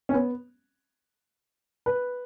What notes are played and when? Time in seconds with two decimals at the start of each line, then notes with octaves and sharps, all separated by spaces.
0.09 C#4
0.14 B3
1.86 B4